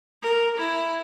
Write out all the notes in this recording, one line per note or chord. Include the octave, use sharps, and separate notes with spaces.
A#4
E4